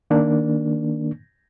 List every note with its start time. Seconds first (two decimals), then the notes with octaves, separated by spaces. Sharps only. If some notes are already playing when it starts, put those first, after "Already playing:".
0.10 D#3 A#3 D4